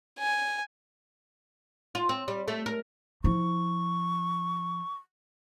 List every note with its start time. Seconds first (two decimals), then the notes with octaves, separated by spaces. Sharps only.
0.19 G#5
1.95 F4
2.09 C4
2.28 G3
2.48 A3
2.66 A#4
3.24 F3 E4 C#6